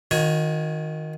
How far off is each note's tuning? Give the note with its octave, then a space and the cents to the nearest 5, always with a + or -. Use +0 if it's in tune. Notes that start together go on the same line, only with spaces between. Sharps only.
D#3 +5 F#4 -40 C#5 +0